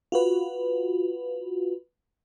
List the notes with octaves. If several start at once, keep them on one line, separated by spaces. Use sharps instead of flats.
F4 F#4 B4